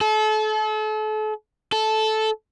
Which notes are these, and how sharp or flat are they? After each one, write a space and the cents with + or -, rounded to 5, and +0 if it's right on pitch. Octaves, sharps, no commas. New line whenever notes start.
A4 -35
A4 -10